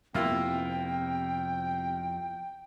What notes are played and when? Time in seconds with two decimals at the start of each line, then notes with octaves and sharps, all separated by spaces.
0.14 F2 C3 A#3 B3 E4 F4 G5